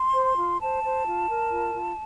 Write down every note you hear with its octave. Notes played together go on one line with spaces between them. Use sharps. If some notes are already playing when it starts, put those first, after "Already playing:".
Already playing: C6
C5
F4
C5 A5
C5
F4
A#4
F4
F4